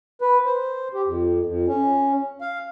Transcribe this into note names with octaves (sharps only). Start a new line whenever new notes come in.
B4
C5
G4
F2
F2
C#4
F5